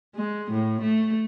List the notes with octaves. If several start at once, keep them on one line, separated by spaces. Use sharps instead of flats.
G#3
A2
A3